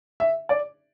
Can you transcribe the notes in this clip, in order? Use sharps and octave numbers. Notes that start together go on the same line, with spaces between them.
E5
D5